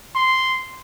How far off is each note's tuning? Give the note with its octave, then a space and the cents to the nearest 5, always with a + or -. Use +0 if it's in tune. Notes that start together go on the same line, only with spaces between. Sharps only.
C6 -5